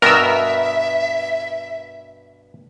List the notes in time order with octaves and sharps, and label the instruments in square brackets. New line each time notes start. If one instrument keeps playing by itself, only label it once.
[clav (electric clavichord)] G2 B2 B3 [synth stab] A#4 E6 [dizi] E5